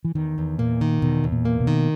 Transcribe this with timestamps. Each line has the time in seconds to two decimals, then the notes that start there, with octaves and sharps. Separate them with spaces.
0.05 E3
0.15 E2 D#3
0.38 E2
0.59 A#2 A#3
0.81 D#3
1.02 E2 B2
1.24 E2
1.32 A#2
1.45 A#3
1.60 B2
1.67 D#3